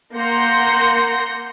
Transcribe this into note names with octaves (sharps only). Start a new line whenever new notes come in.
A#3 F#5 C6 G6 A#6 C#7